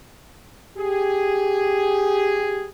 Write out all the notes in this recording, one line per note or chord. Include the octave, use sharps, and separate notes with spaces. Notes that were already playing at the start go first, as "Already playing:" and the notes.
G4 G#4